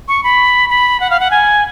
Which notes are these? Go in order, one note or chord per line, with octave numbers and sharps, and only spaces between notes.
C#6
B5
B5
F#5
F5
F#5
G#5